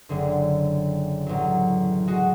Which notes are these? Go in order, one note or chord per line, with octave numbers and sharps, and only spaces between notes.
F#1 D3
A1 F#3
G#3 F#4